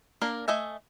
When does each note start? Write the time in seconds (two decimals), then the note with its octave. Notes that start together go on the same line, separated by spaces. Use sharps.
0.22 A#3 D4 A#4
0.48 A3 D#5 E5 G#5